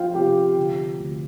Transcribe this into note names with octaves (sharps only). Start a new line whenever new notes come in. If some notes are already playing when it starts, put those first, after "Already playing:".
Already playing: F3 F4 F5 G5
C3 G4 G5
D3
D2